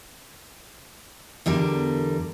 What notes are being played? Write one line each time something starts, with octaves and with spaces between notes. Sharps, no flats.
E2 D3 G3 A#4